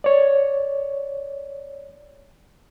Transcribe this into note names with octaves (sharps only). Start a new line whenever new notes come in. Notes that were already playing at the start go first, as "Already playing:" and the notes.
C#5 D5